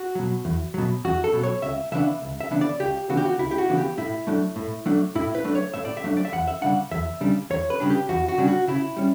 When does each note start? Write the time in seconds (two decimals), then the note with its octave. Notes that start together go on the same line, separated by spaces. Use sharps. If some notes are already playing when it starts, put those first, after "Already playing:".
Already playing: F#4
0.15 B2 F#3
0.45 E2
0.74 B2 F#3
1.05 E2 F#4
1.24 A4
1.33 B2 F#3
1.43 C#5
1.62 C#2 E5
1.92 C#3 E3 B3 D4 E5
2.22 C#2
2.41 E5
2.51 C#3 E3 B3 D4
2.61 D5
2.80 C#2 G4
3.09 C#3 E3 B3 D4 F#4
3.17 G4
3.25 F#4
3.39 C#2 E4
3.51 G4
3.58 F#4
3.69 C#3 E3 B3 D4
3.78 G4
3.97 A2 E4
4.27 F#3 A3 D4
4.56 A2
4.86 F#3 A3 D4
5.15 A2 E4
5.35 B4
5.45 F#3 A3 D4
5.55 C#5
5.74 A2 E5
5.85 D5
5.97 E5
6.04 F#3 A3 D4
6.17 D5
6.25 E5
6.32 E2 F#5
6.48 E5
6.62 C#3 G3 D4 F#5
6.91 E2 E5
7.21 C#3 G3 D4
7.50 E2 C#5
7.70 B4
7.80 C#3 G3 D4
7.90 G4
8.09 E2 F#4
8.28 F#4
8.38 C#3 G3 D4
8.48 F#4
8.68 C#3 E4
8.96 G3 C#4